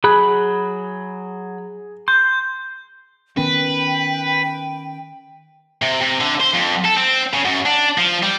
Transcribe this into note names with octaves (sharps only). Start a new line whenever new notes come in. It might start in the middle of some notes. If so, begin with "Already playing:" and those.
F#3 G#4 B5 F#6
C6 G6
D#3 B3 C#4 B4 G5
C3
C3
D3
C5
F2
A4
C4
C#3
F#2
D4
F3
G3